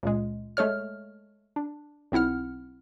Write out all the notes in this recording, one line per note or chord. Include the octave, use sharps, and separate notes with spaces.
C#2 A#2 G#3
G#3 A3 A4 C#5 F6
D4
B1 C4 E4 F#5 F6